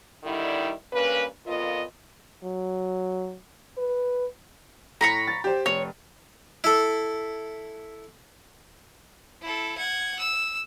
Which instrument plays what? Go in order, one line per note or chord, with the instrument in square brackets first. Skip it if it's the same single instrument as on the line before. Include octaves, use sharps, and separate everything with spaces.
[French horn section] D3 D#3 G3 D#4 E4
G2 A#3 C#4 B4
F2 A#2 B3 F4 A#4 D#5
[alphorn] F#3
B4
[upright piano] A2 [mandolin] A#5 B5 C#6
[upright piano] A6
G4 C5
[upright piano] F1 [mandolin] C#5
[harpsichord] E4 A4
[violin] E4 A4
F#5 G#6
E6